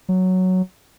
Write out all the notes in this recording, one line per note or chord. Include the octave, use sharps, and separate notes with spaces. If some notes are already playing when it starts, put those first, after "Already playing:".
F#3